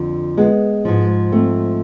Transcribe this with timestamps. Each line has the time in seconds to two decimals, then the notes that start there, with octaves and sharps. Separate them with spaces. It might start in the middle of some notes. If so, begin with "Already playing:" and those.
Already playing: F2 D3 F3
0.37 G#3 B3
0.85 G#2 F3
1.32 A3 C4